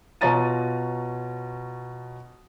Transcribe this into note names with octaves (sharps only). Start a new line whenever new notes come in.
B2 F4 C#5 A#5 A6 D#7